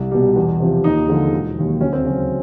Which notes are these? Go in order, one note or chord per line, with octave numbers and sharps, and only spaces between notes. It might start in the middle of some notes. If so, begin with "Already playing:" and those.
Already playing: C2
B2 G3
E2
C3 F3
D#2 D#4
D3 F3 G#3
E1
D#2 D#3 F#3
D2 C#4
C4
C#3 F#3 C#4